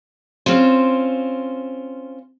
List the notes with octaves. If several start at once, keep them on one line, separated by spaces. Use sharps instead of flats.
C4 C#4 F4 C5